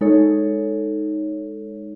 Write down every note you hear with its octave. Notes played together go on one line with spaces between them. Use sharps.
G#3 D#4 A4 C#5